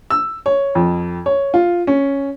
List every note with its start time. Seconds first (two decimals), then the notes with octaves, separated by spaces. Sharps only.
0.10 E6
0.46 C#5
0.75 F2
1.26 C#5
1.54 F4
1.87 C#4